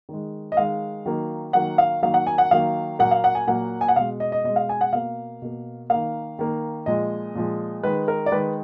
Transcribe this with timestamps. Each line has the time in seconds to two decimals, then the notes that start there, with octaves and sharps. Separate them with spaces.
0.09 D#3 G#3
0.52 D#5
0.57 D#3 G#3 F5
1.06 D#3 F#3 A#3
1.53 D#3 F#3 A#3 F#5
1.78 F5
2.02 D#3 F#3 A#3 F5
2.14 F#5
2.27 G#5
2.38 F#5
2.51 D#3 F#3 A#3 F5
2.99 A#2 F#3 A#3 F#5
3.11 F5
3.24 F#5
3.35 G#5
3.47 A#2 F#3 A#3 F#5
3.81 G#5
3.88 F#5
3.96 B2 G#3 F5
4.20 D#5
4.32 D#5
4.44 B2 G#3 D#5
4.56 F5
4.69 G#5
4.81 F#5
4.92 B2 A#3 F5
5.42 B2 A#3
5.90 D#3 A#3 F5
6.39 D#3 A#3
6.86 A#2 F3 G#3 D#5
7.35 A#2 F3 G#3
7.83 D#3 G#3 B4
8.08 A#4
8.26 D5
8.31 D#3 G#3 B4